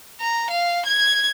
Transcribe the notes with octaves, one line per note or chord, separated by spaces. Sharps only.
A#5
F5
G#6